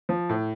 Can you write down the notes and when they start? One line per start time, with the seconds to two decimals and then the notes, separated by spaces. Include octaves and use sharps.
0.09 F3
0.29 A2